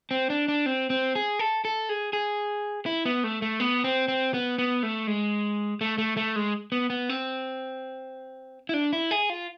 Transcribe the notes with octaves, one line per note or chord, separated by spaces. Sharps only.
C4
D4
D4
C4
C4
G#4
A4
A4
G#4
G#4
E4
B3
A3
A3
B3
C4
C4
B3
B3
A3
G#3
A3
A3
A3
G#3
B3
B3
C4
E4
D4
E4
G#4
F4